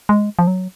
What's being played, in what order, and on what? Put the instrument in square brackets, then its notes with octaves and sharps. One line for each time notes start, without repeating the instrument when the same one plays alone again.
[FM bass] G#3
F3
F#3